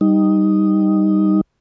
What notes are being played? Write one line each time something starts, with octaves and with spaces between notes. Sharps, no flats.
G3 D#4